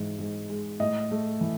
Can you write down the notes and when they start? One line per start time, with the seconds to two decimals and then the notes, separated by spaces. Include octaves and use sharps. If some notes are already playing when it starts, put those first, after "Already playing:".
Already playing: G#2 E3
0.19 G#2
0.50 G#3
0.80 A2 D#5
1.11 A3
1.41 E3